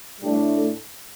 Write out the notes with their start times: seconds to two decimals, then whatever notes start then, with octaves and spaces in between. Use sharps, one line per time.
0.20 A2 G3 A3 D4 G4
0.55 A3 A4